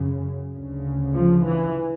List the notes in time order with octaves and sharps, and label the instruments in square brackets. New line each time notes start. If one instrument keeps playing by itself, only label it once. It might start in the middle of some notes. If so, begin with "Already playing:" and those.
Already playing: [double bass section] F#2 C#3
D2 C#3
F3
E3